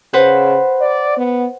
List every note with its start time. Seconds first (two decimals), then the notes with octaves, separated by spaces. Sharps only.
0.13 C#3 B4 C5 F#5
0.81 D5
1.17 B3